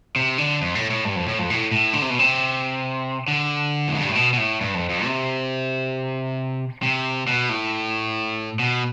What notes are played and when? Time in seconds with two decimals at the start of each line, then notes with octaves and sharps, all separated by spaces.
0.16 C3
0.38 D3
0.61 F2
0.75 A2
0.90 A2
1.05 G2
1.16 F2
1.28 A2
1.39 F2
1.50 A2
1.72 A2
1.93 D3
2.02 C3
2.10 B2
2.19 C3
3.28 D3
3.88 E2
3.95 F2
4.02 G2
4.09 A2
4.15 B2
4.33 B2
4.38 A2
4.61 G2
4.74 F2
4.90 F2
5.04 C3
6.83 C3
7.27 B2
7.49 A2
8.59 B2